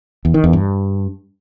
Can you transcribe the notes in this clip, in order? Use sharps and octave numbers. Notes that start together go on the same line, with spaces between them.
E2
D#3
E2
G2